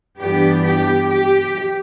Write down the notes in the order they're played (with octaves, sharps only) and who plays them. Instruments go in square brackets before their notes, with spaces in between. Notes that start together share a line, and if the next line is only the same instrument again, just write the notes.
[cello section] G2 E3 B3 D4 G4
G4
G4